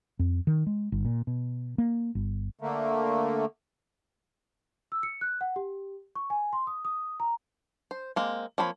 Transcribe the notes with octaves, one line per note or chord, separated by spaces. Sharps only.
F2
D#3
G#3
G1
A#2
B2
A#3
G1
D3 A3 A#3
E6
C#7
F#6
F#5
G4
C#6
G#5
C6
D#6
D#6
A#5
C5
G#3 A#3 C4
F3 A#3 C4 C#5 B5